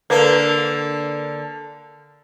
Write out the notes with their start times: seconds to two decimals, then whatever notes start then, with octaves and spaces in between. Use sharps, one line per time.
0.10 D3 A#3 A#4 B4